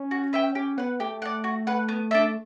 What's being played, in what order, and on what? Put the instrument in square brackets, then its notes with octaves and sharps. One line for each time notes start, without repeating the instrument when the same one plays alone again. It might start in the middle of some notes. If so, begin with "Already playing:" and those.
Already playing: [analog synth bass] C#4
[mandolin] F#4
B4 E5 G5
[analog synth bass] C#4 [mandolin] G4
[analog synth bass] B3 [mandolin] B4 F#5
[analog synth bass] A3 [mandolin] G4
[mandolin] D5 F#5
F#4
B4 F#5
B3
D4 A4 E5